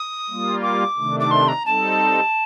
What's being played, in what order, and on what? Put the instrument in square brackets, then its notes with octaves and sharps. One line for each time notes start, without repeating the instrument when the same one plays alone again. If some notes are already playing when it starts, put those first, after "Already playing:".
Already playing: [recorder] D#6
[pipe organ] G3 A#3 F4
[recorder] D6
[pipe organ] C3 D#3 A3 D4
[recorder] D6
C6
A#5
[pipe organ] G3 C4 D#4 A4 [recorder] A5